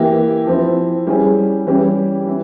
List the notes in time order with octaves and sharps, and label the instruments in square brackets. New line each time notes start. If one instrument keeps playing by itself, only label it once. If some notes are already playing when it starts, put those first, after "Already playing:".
Already playing: [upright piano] E3 A#3 E4 G4
F3 C4 E4
G3 C#4 E4 G#4
E3 G3 C#4 G4
E3